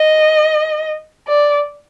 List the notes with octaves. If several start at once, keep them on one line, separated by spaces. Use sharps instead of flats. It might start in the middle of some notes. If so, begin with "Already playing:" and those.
Already playing: D#5
D5